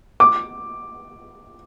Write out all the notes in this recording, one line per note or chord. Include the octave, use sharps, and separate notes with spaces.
D6